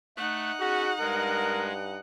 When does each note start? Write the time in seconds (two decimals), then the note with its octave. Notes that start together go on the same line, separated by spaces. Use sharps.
0.17 A3 D#4 F#5 F#6
0.60 C#4 F#4 G#4
1.00 G2 G#3 A#4